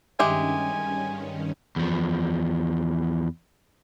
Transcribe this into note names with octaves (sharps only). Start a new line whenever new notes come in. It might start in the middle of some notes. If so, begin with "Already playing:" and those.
G2 D#3 G#3 C#4 G4 E5 G#5
E2 F3